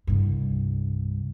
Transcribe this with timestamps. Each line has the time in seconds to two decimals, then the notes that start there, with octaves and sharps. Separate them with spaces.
0.07 C2 G2